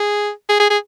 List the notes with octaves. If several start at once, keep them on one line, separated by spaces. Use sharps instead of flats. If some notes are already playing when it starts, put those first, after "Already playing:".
Already playing: G#4
G#4
G#4
G#4